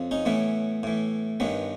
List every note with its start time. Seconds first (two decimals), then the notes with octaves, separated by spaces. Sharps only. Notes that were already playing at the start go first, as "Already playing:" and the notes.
Already playing: F2 C#3
0.11 C#4 D#4
0.25 A2 E3 B3 C#4
0.83 A2 E3
1.40 G2 D#3 B3 C#4